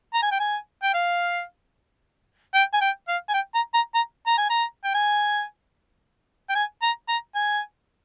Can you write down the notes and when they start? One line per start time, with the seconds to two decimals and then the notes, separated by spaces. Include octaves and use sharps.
0.14 A#5
0.22 G#5
0.32 G5
0.40 G#5
0.83 G5
0.94 F5
2.54 G5
2.74 G#5
2.81 G5
3.08 F5
3.29 G#5
3.34 G5
3.55 A#5
3.74 A#5
3.95 A#5
4.27 A#5
4.38 G#5
4.50 A#5
4.84 G5
4.94 G#5
6.49 G5
6.55 G#5
6.82 A#5
7.08 A#5
7.35 G#5